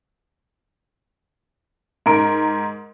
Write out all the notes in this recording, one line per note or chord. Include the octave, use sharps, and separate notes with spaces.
G#2 A#4 D7